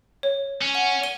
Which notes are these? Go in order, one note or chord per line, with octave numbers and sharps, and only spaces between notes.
C#5
C#4
F#5
D#7 G7